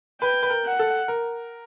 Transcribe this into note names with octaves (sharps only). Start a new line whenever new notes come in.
B4 G5
B4
A#4
F#5
A4
A#4